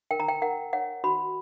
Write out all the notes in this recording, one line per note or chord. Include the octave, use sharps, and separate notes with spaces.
A#4 G5
A#5
G5
A#4 F#5
C#5 F#5
F#4 B5